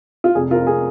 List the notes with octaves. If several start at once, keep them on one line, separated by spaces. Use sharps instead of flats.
F4
F1 G#4
F4 A#4
F2
G#4